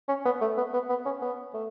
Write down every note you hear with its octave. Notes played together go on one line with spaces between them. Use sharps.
C#4
B3
A3
B3
B3
B3
C#4
B3
A3